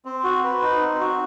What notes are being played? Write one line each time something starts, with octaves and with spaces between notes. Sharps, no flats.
C4
F#4
B4
D#4
C4
F#4